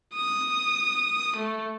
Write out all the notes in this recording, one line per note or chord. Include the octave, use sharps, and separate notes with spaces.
D#6
A3